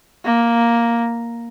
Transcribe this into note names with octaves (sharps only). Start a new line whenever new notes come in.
A#3